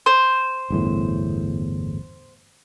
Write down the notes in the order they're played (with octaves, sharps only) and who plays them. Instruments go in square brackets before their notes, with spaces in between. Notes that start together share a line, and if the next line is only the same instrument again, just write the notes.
[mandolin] C5
[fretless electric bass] G1 E2 A2